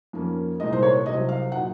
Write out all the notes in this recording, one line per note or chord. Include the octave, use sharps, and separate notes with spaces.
F2 D#3 A#3 C#4
C2 A#2 G#3 D#4 D#5
C5
C#5
C2 C3 F#3 C4 D#5
F5
A#2 F#3 A#3 D#4 F#5